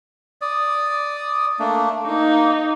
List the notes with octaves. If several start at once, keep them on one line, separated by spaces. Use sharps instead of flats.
D5 D#6
A3 A#3 D4
A#3 D#4